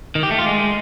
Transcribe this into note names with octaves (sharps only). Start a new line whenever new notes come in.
D#3
G4
A3
F4
G#3